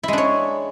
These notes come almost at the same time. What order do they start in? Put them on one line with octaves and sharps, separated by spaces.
E4 G#3 D4 C#5